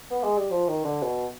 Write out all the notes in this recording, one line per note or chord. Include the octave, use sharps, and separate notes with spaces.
B3
G#3
G3
F3
D#3
D3
B2